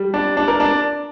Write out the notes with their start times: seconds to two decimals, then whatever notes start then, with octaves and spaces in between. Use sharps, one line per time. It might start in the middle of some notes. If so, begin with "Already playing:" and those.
Already playing: G3
0.14 D4
0.37 D4
0.48 A#4
0.60 D4